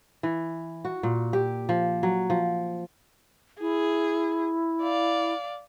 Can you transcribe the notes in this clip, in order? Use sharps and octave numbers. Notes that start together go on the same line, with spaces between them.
E3
F#4
A#2
G4
F3
F#3
F3
E4 G#4
D5 F5